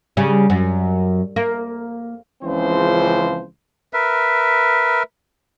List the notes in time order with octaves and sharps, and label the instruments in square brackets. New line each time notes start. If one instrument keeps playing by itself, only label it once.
[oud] C#3 G3
F#2
A#3
[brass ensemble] C#2 C#3 E3 F3 C4 C5
[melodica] A#4 B4 E5